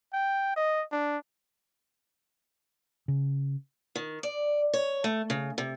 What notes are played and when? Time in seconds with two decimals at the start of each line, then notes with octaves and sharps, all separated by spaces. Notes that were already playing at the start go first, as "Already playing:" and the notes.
0.13 G5
0.56 D#5
0.92 D4
3.08 C#3
3.96 D#3
4.23 D5
4.74 C#5
5.04 A3
5.30 C#3
5.58 C3